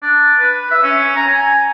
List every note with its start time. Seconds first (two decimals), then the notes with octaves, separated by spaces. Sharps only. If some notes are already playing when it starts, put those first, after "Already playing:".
0.03 D4
0.39 B4
0.71 E5
0.83 C#4
1.16 A#5
1.27 G#5